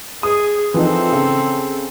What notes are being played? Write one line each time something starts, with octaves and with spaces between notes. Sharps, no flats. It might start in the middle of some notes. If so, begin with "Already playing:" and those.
G#4 D#6
E3 F3 C4 D#4 A4
C#3